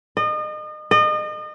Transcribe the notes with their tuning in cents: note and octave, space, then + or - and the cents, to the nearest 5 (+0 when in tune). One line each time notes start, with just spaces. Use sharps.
D#5 -35
D#5 -35